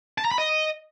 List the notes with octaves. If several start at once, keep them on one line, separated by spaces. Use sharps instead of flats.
A5
A#5
B5
D#5